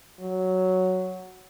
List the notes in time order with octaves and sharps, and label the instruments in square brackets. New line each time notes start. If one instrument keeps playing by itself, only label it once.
[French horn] F#3